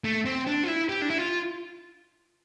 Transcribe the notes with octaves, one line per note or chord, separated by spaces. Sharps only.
A3
C4
D4
F4
E4
G4
D4
E4
F4